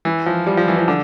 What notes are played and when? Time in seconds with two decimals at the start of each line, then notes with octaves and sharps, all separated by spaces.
0.05 E3
0.26 F3
0.47 G3
0.57 F3
0.68 E3
0.78 F3
0.88 D3